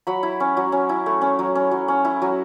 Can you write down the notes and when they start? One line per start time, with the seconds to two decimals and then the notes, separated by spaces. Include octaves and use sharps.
0.07 F#3 B5
0.23 E4
0.40 C#4
0.57 F#3
0.72 C#4
0.89 E4
1.06 A3
1.22 C#4
1.39 F#3
1.55 C#4
1.71 F#3
1.88 C#4
2.05 E4
2.22 F#3